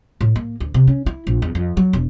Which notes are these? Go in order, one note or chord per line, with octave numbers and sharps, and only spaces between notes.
A2
A#3
D2
C3
C#4
E4
A#1
E2
F2
F#3
E1